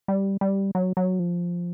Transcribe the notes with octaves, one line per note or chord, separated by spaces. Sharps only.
G3
G3
F#3
F#3
F3